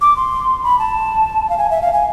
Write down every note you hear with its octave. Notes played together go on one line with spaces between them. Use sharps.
D6
C6
B5
A5
F5
G#5
E5
F5
G#5